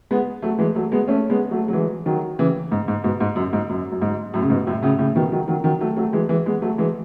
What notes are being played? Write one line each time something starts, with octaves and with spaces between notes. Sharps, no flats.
G#3 B3
F#3 A3
E3 G#3
F#3 A3
G#3 B3
A3 C#4
G#3 B3
F#3 A3
F#3
E3 G#3
D#3 F#3
C#3 E3
G#2
G#2
G#2 B2
G#2
F#2
G#2
F#2
F#2
G#2
F#2 A2
C#3
G#2 B2
F#2 A2
A2 C#3
A2 C#3
B2 D#3
D#3 F#3
D#3 F#3
D#3 F#3
F#3 A3
F#3 A3
E3 G#3
E3 G#3
G#3 B3
F#3 A3
E3 G#3